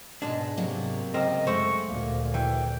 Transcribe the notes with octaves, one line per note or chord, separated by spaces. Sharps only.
G#2 B2 G#3 D4
C3 F#3 A#3 B3
C#2 C4 A#4 D#5
F#2 G#3 A3 C5 F#5 C#6
D2 A#2 A#3
E3 G5